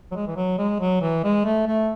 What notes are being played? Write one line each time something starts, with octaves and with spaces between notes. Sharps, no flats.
F#3
G#3
E3
F#3
G#3
F#3
E3
G#3
A3
A3